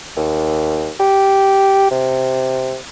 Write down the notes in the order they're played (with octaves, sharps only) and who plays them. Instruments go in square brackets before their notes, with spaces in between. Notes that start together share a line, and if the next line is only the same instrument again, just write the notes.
[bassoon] D#2
G4
C3